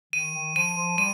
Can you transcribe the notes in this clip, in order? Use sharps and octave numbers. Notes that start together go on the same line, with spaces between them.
D#3 D#7
D#3
F3 D#7
F3
G3 D#7